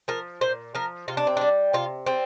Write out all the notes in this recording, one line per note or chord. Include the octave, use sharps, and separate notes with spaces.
F3 A#4
A#2 C5
F3 A#4
C3 F4
D4
C4
G3 D4
C3 F4
G3 C4